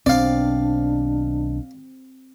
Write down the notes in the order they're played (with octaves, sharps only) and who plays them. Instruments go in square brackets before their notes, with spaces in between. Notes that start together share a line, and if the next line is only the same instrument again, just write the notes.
[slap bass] B1 D#3 [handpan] C4 [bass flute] D4 [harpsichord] D5 F5